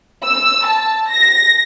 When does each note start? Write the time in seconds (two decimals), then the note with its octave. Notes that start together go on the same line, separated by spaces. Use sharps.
0.24 E6
0.65 A5
1.10 A#6